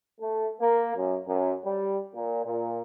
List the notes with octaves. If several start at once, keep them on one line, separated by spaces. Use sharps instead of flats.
A3
A#3
F#2
F#2
G3
A#2
A#2